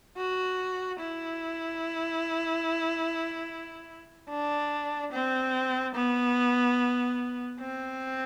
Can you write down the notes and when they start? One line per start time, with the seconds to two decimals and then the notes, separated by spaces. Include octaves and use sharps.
0.17 F#4
1.00 E4
4.30 D4
5.12 C4
5.95 B3
7.60 C4